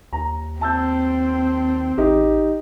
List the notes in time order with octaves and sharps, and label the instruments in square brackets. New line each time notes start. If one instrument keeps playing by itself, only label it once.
[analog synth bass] D#2 [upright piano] A#5
[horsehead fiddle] C4 [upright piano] A5 E6 G6
[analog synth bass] A1 [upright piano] D#4 G4